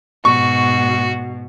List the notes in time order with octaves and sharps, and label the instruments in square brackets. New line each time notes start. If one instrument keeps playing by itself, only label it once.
[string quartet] G#2 B2 [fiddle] F#4 [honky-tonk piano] C#6